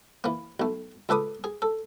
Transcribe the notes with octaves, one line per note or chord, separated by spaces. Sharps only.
E3 A#3
B1 A3
C#2 A4 B4 D6 D#6
G#4
A4